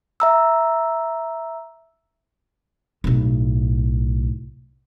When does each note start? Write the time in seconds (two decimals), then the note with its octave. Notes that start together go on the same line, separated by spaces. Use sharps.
0.20 E5 A#5 E6
3.04 B1 A2